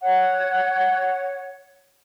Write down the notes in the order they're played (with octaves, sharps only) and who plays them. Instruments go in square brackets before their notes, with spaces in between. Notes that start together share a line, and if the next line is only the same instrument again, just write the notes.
[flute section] C#5 F#5